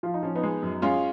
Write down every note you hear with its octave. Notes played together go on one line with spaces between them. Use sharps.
F3 F4
D#4
F3 C#4
B3 D#4
G#3
F#2
G#3 C#4 F4